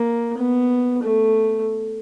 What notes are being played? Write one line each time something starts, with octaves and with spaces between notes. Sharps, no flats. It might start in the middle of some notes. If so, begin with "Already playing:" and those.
Already playing: A#3
B3
A3